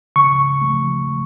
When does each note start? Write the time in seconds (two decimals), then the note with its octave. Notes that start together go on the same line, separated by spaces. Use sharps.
0.16 C#3 C#6
0.62 F3 A3